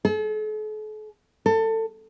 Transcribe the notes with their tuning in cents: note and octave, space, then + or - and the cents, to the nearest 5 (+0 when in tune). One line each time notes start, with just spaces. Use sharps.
A4 -45
A4 +25